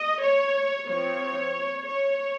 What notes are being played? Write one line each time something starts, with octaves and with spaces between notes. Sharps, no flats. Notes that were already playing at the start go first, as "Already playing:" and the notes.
Already playing: D#5
C#5
F3 C4 C#5
C#5